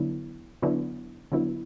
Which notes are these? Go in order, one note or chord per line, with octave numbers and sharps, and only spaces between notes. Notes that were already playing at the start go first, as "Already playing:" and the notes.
Already playing: D3 F#3 B3 E4
D3 F#3 B3 E4
D3 F#3 B3 E4